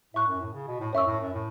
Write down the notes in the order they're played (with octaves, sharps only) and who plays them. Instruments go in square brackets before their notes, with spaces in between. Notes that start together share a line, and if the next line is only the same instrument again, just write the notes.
[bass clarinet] A2 [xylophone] E5 C#6 F#6
[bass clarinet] F#2
A2
C#3
B2
A2
[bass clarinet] F#2 [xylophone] C#5 E5 C#6 E6
[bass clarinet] A2
F#2
A2